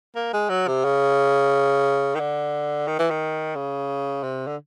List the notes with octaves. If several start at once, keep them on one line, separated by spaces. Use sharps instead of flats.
A#3
G#3
F#3
C3
C#3
D#3
D3
D#3
E3
D#3
C#3
C3
D3